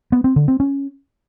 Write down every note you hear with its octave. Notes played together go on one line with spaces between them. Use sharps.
B3
C4
D3
C4
C#4